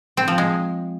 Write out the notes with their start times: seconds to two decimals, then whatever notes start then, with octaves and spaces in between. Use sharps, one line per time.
0.17 C4
0.28 F3
0.38 G#3